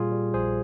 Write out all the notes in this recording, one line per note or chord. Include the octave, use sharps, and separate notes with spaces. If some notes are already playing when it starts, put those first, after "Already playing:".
Already playing: A#2 G3 F4 G#4
G3
A#1 G#4 C5